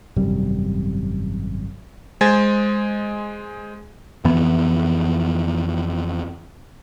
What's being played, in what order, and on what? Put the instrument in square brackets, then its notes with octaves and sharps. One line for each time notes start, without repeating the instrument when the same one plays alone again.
[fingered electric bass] G#1 F#2 C3 G3
[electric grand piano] G#3 C5 G#5 G#6 A6
[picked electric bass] F2 E3 B3